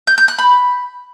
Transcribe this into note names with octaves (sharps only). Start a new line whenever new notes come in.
G6
G6
F#6
B5